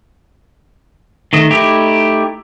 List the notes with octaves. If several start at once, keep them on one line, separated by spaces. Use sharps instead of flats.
D#3 A3 D#5
A3 D#4 E4 G4